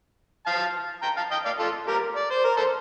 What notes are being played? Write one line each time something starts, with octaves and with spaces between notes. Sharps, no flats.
F5 A5
G5 A#5
F5 A5
D#5 G5
D5 F5
F4 A4
G4 A#4
D5
C5
A#4
A4 C5